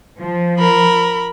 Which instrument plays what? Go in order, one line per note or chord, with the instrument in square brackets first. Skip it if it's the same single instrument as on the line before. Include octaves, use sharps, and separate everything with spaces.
[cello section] F3
[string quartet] A#4 B5